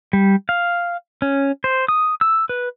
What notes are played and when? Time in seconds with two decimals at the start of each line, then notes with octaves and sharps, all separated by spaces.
0.13 G3
0.49 F5
1.22 C#4
1.64 C5
1.88 D#6
2.21 E6
2.49 B4